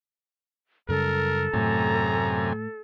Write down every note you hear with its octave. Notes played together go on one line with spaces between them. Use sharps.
F#2 C#3 G3 A4 A#4
F#2 A2 C3 A3 G#5 A#5